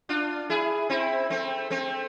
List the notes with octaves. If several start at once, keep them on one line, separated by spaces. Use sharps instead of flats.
D4 F4
E4 G#4
C4 E4
A3 C4
A3 C4